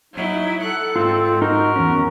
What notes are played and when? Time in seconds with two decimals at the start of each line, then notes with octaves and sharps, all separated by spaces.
0.14 F#3 D#4 E4
0.62 A4 F#5 F#6
0.96 G#2 C4 F4
1.42 D#4 F#4 A#4 D#5
1.76 E2 C#4